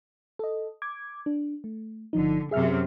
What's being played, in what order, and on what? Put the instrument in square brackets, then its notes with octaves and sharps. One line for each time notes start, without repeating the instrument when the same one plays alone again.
[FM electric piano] A4 D#5
D6 G#6
D4
A3
[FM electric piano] G1 F3 D#4 [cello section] D3
[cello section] F#2 C3 [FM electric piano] G#4 E5 F6